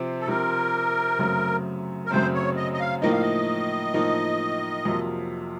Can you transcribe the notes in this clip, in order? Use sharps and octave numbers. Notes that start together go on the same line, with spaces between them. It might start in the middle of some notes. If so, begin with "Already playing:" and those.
Already playing: C3 F3 C4
A4
C3 F3 C4 A#4
F#2 C#3 F#3 A3 C4
A#4
F#2 C#3 F#3 A3 C4 C5
C#5
D#5
D#5
F5
A2 F3 A#3 D#4 D#5
F5
D#5
A2 F3 A#3 D#4
F2 C3 F#3 A#3 F4